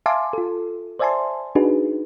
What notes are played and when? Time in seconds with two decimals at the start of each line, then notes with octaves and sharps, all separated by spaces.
0.06 E5 F5 G#5 A5 C6 D6
0.33 F4 A4
0.99 C5 D5 E5 G#5 A5 C6
1.55 D4 D#4 F#4 G#4 B4